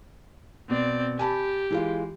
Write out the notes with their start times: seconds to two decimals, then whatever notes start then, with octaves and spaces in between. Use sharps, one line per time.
0.70 B2 C4 D5
1.19 G4 G#5 A5 B5
1.70 E3 G#3 F4